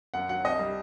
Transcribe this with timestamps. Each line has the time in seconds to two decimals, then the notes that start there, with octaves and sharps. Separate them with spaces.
0.14 F#2 F#5
0.29 F#3 F#5
0.44 C2 D#5
0.59 G3